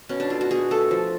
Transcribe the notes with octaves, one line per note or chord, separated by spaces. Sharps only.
B2 C#4
D4
A3 F4
F#4
B2 G#4
A3 A4
F3